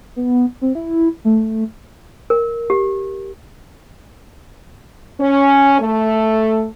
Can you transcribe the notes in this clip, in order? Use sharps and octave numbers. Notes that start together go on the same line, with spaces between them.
B3
C4
E4
A3
A#4
G4
C#4
A3